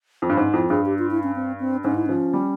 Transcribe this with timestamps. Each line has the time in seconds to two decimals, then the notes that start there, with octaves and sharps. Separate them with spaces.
0.22 F2
0.29 G2
0.37 G#2 C#4
0.53 F2 E4
0.70 G2 G#4
0.86 G4
0.99 F4
1.11 E4
1.23 C#4
1.35 C4
1.60 C4
1.84 G#2 C#4
1.95 E4
2.06 F3 C#4
2.33 G3